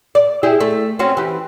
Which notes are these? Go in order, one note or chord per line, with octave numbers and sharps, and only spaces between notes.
D5
E4 G4 G#4
A3
C4 C#4 F#4
E3 G4